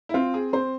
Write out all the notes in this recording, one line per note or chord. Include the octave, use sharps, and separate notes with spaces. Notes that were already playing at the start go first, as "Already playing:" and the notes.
E4
C4 F4
G#4
C4 C5